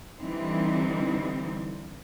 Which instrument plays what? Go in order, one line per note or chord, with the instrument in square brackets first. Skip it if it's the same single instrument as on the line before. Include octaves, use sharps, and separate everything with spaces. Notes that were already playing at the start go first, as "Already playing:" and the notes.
[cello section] D3 E3 G3 C4 D#4